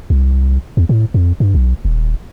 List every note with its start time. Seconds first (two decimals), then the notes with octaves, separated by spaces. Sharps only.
0.10 C2
0.77 E2
0.89 A2
1.14 F2
1.40 G2
1.55 B1
1.85 D#1